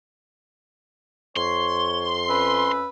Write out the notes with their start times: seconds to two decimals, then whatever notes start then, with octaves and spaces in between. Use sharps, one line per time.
1.36 F2 C#5 C6
2.29 C#4 B4 E5